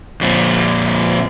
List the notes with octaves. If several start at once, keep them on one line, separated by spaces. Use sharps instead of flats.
F2 A#2